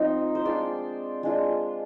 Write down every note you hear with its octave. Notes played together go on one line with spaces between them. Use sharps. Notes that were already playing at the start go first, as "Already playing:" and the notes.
Already playing: F3 C4 D#4
C5
G#3 D4 F4 D5
G#3 D4 F4